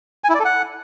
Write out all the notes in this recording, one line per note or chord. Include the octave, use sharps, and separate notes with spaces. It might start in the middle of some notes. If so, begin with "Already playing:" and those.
G#5
E4
D5
A4
F#5